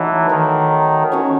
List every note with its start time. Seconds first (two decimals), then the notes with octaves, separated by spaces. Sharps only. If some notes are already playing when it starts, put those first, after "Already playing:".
Already playing: E3 F#3 A3 D#4
0.31 D#3
1.12 C#4 F#4 C#5